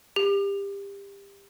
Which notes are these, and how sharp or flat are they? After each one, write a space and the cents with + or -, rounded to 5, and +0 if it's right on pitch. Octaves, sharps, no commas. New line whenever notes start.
G4 +25